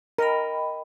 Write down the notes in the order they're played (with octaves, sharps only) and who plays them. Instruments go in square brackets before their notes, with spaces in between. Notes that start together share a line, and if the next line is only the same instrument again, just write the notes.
[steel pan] A#4 [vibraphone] D#5 G5 B5